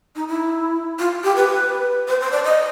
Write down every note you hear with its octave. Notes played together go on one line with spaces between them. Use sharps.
D#4
E4
F4
G4
B4
C5
C5
D5
D#5